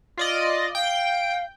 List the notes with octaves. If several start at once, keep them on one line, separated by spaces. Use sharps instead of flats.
F4 D5 D#5
F5 G5